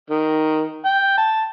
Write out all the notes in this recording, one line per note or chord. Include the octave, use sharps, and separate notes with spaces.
D#3
G5
A5